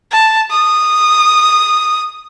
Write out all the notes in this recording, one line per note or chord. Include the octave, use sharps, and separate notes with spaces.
A5
D#6